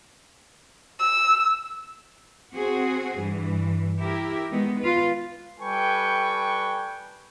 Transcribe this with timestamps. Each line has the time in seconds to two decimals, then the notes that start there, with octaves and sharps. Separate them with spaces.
0.99 E6
2.54 C4 F#4 G#4
3.18 G2 E3
3.99 E4 G4 A#4
4.51 D#3 G#3 B3 D#4
4.79 F4 B4
5.59 G3 A4 B4 G5 G#5 C#6